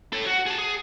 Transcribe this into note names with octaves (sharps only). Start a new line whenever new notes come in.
A4 C#5
F#4
G#4 A5
G#4